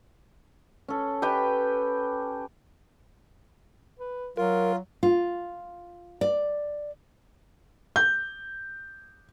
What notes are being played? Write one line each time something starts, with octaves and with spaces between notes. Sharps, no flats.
C#4 A4
G4 B4 G5
B4
F#3 F4 A#4
F4
D5
G6